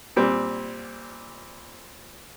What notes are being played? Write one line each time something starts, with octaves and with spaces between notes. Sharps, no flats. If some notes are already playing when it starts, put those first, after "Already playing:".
A#2 G3 C4